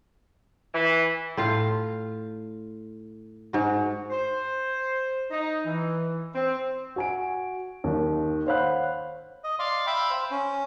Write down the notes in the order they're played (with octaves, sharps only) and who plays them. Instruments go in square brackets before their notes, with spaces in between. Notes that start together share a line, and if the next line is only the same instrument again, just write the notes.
[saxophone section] E3
[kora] A2 F4 F5
G#2 F#4
[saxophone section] C5
D#4
E3
C4
[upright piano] F#4 G#5 D7
D#2 D#3
C5 C#5 F5 F#5 B5 F#6
[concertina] D#5
D5 F5 C6
E5 F5 G5 B5
C5
C#4